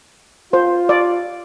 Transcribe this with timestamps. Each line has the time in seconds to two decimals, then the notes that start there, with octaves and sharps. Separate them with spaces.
0.53 F4 C5
0.89 D5